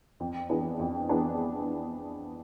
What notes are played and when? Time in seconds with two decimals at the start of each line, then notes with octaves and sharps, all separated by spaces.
0.20 F2
0.49 E3 B3 D4 G#4
0.79 F2
1.09 E3 B3 D4 G#4